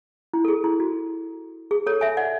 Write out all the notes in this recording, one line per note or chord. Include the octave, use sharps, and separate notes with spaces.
E4
A4
G#4
E4
F#4
G#4
A4 C#5
E5 G#5
D5 F#5